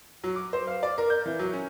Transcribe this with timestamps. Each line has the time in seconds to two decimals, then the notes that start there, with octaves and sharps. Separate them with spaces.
0.23 F#3
0.36 D6
0.53 C5
0.67 F5
0.83 D5
0.98 A#4
1.10 G6
1.26 E3
1.39 F#3
1.53 C#4